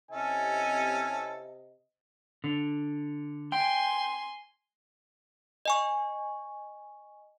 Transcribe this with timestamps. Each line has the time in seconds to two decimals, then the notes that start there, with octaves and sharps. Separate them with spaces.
0.11 C3 C#4 E4 A4 D#5 G#5
2.44 D3
3.52 G5 G#5 C6
5.65 D#5 G#5 C#6